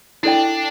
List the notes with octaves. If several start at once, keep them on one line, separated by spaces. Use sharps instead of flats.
D4 E4 A4 D5 G5